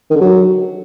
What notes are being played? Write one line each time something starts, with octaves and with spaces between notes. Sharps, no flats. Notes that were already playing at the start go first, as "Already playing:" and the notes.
D#3
D3
F#3